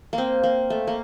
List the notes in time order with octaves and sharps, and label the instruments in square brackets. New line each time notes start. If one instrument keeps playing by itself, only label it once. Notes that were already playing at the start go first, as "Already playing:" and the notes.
[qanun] A#3
C4
A#3
A3
A#3